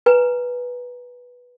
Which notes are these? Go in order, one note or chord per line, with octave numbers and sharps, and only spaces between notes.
B4 G#5 A#5